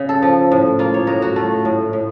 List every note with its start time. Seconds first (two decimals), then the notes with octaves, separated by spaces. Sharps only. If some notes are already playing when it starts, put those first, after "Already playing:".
Already playing: C#3
0.09 A4
0.22 F3
0.52 A2
0.79 A#3 F4
0.94 C#5
1.07 A2 A#4
1.22 F#4
1.36 A3 F4
1.65 A2
1.93 A2